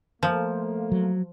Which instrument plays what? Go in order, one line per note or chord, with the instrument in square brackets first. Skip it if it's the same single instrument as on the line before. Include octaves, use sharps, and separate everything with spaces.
[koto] F3 [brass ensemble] A3 A#3
[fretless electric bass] F#3